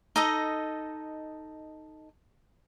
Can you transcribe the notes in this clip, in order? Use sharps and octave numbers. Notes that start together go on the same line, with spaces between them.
D#4 A4 D#5